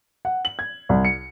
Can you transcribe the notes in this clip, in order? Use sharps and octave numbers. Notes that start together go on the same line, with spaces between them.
F#5
F#7
G#6
C2
C#7